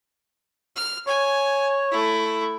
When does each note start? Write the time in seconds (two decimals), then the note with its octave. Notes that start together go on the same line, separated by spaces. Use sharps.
0.76 F6
1.08 C#5 G#5
1.92 A3 E4